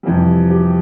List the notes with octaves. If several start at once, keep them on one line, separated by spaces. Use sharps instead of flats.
F2 C3 E3 G3
G4